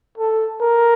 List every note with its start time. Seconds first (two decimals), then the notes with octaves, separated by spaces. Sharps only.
0.18 A4
0.61 A#4